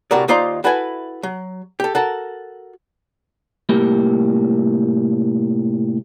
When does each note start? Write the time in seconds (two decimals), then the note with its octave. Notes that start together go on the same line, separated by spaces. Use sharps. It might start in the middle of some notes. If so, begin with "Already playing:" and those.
0.11 A2 C3 F#4 A#4 D5
0.28 D#2 D#4 F4 C5 D5 A#5
0.64 E4 F#4 A4 B4 E5 G#5
1.23 F#3
1.80 G4 A4
1.95 F#4 A4 A#4
3.69 C2 A2 A#3 G4 B5